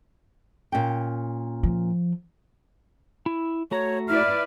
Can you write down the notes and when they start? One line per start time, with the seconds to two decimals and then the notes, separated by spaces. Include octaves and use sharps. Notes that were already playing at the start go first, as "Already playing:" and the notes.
0.72 A#2 C#4 G5
1.63 F3
3.26 E4
3.71 A3 F#4 C#5 A#5
4.08 E4 B4 D5 F6